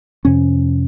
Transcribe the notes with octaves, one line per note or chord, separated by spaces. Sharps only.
F2 C3 C#4